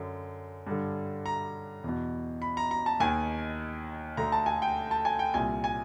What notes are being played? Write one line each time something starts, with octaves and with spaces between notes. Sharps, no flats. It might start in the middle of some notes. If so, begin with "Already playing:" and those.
Already playing: F#2 D3
G2 D3
A#5
E2 B2
B5
A#5
A#5
A5
D#2 D#3 G#5
D2 D3 A#5
A5
G#5
G5
A5
G#5
G5
C2 A#2 G#5
G#5